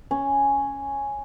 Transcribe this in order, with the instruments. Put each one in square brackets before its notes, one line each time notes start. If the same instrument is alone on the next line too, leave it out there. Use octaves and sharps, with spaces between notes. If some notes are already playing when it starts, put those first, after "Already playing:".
[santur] C#4